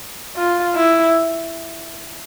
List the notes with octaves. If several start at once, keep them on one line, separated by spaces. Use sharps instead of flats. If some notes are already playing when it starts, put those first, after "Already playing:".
F4
E4